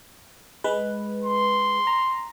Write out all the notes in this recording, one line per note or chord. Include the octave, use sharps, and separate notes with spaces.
G#3 B4
C6
A#5